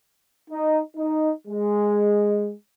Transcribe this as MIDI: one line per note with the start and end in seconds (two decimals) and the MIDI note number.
0.51 0.79 63
0.97 1.31 63
1.47 2.53 56